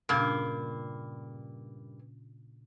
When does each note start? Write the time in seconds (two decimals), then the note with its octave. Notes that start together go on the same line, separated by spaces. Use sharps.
0.09 G2 A#2 C#3 A#3 D4